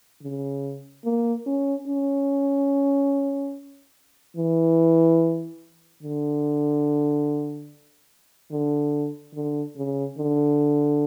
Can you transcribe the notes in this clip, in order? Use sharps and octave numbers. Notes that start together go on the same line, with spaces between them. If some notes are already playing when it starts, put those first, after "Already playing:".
C#3
A#3
C#4
C#4
E3
D3
D3
D3
C#3
D3